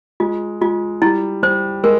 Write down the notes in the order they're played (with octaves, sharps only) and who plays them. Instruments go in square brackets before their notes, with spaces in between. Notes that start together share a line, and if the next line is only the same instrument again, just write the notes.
[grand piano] G#3 [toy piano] F4
[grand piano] G#3 [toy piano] F4
[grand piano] G3 [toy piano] E4
[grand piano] G3 [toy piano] C5
[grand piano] G#3 [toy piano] A#4